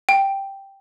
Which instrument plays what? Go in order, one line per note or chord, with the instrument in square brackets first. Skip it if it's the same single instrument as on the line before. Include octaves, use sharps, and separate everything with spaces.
[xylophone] G5